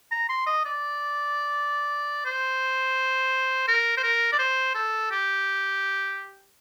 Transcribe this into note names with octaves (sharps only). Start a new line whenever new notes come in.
A#5
C6
D#5
D5
C5
A#4
C5
A#4
D5
C5
A4
G4